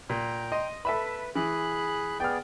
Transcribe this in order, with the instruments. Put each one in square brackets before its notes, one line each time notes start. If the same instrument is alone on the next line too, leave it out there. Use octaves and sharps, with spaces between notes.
[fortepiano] A#2 [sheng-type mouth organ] G5 A#5
[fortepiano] D#5 C6
[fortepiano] A4 E5 B5 [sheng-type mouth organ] B4
[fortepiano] E3 [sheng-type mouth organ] G#4 B5 F#6
[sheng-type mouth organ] B3 G#4 D5 [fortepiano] G5 F6